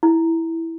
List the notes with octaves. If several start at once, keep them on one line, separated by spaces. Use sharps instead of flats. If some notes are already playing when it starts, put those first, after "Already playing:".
E4